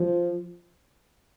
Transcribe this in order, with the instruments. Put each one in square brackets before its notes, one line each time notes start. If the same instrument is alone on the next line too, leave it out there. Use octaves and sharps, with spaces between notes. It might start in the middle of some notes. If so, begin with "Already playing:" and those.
Already playing: [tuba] F3